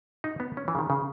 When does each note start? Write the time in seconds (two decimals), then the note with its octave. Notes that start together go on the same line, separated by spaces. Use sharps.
0.24 D#4
0.40 B3
0.57 C#4
0.68 E3
0.75 C#3
0.79 D#3
0.90 C#3